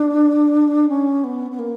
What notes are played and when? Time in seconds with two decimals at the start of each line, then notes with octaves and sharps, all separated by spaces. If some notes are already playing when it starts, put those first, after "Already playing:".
Already playing: D4
0.89 C#4
1.23 B3
1.51 B3
1.58 A#3